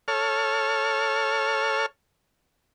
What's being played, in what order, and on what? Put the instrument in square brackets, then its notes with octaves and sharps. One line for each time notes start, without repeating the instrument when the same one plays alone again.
[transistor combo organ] A4 C#5 F6